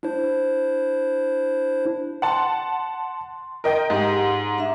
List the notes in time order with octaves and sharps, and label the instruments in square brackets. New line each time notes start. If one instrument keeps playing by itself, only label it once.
[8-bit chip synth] D4 E4 C5
[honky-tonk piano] F#5 A5 [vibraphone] C6
[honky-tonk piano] A#4 D#5 G5
[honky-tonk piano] G#2 [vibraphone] G4
[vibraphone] D4 E5